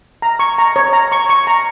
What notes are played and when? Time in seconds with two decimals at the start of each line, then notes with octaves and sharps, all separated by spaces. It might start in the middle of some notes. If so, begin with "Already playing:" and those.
0.22 A#5
0.39 C#6
0.58 A#5
0.76 C#5
0.93 A#5
1.12 C#6
1.29 C#6
1.47 A#5